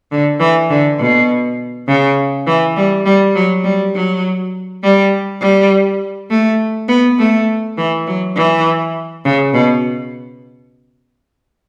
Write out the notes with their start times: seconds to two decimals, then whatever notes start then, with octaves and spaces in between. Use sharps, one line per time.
0.12 D3
0.40 E3
0.70 D3
0.99 B2
1.88 C#3
2.47 E3
2.77 G3
3.06 G3
3.36 F#3
3.64 G3
3.95 F#3
4.83 G3
5.41 G3
6.30 A3
6.89 B3
7.19 A3
7.78 E3
8.07 F#3
8.37 E3
9.25 C#3
9.54 B2